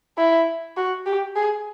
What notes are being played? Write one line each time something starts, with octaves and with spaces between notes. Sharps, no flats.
E4
F#4
G4
G#4